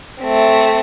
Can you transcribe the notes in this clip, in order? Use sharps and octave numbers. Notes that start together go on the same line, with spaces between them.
A3 C4